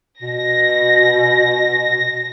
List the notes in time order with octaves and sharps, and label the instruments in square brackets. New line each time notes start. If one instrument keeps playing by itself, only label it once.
[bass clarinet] B2 [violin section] A#6